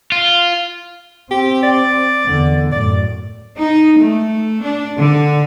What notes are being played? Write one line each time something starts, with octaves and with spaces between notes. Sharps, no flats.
F4
C4 G4
D5
E2 D3
F#2 A2 D5
D#4
A3
D4
D3